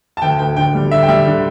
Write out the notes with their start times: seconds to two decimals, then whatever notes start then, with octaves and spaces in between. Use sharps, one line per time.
0.17 A5
0.22 D2 G5
0.39 D2 G5
0.56 D3 G5
0.75 G3
0.91 D3 E5
1.03 G5
1.08 G3 E5
1.27 D3